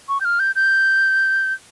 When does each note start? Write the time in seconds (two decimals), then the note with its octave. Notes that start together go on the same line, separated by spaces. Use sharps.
0.09 C#6
0.21 G6
0.25 F6
0.40 G6
0.56 G6